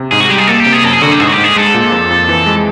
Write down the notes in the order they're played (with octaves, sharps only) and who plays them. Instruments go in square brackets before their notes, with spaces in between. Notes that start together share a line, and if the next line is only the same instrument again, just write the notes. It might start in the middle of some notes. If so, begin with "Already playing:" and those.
Already playing: [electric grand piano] C3
[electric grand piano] G#2 [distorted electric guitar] G#4
[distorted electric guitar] F#4
[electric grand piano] G3 [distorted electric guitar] G4
[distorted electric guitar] G#4
[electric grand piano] A#3 [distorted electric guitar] A4
[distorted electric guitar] G4
[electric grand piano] C3
[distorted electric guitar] G#4
[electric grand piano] F#2 [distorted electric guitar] A4
[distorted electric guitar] G#4
[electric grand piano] D3 [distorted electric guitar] F#4
[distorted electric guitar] G4
[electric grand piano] G#2 [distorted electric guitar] G#4
[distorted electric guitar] F#4
G4
[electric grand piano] G#2
[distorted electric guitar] G#4
[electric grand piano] G#3 [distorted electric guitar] A4
[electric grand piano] A#2
F2
F2
E3
G#3